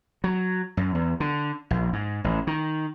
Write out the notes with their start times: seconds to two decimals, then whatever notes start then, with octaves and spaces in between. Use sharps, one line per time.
0.24 F#3
0.77 F#2
0.95 E2
1.20 D3
1.71 A#1
1.93 G#2
2.24 A1
2.47 D#3